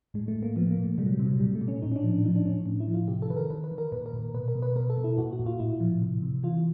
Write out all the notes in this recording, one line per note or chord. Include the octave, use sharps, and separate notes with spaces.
A2 G#3
A3
A2
A#3
F3 B3
A#3
A#2
A3
C3 G3
F#3
G3
C3
F#3
A#2 G3
A3
A#2
C#4
A2 D#4
C#4
D4
F3
D4
F3 D#4
D4
A2 C#4
A2
E4
F3
F4
C3 G4
A4
D#3 B4
A#4
D#3 B4
B4
D#3
A#4
A#2 B4
A#4
A#2
B2 B4
A#4
B2
B4
B2 A#4
A4
B2
E4
A#2 F#4
F#4
A#2
F4
A2 E4
F3
C3
C3
E3 F4